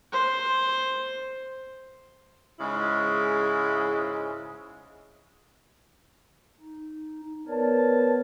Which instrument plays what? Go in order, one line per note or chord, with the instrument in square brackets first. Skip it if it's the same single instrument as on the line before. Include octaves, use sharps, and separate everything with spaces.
[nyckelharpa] C5
[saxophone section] G#2 C#3 G#3 E4
[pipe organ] D#4
[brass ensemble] B3 A5 [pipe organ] A#4 C#5 D5